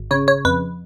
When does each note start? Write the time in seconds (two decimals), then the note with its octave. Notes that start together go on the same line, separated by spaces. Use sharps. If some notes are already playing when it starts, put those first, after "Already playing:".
Already playing: G#1
0.11 C#3 C#5
0.28 C#5
0.45 F2 B4